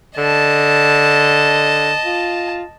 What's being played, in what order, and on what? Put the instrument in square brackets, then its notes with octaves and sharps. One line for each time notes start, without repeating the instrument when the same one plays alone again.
[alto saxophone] D3 [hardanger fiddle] D#5 A5
[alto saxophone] F4